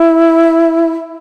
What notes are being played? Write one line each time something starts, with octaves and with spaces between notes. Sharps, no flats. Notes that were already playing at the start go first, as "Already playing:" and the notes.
Already playing: E4